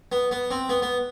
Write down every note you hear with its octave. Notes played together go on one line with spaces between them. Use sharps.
B3
B3
C4
B3
B3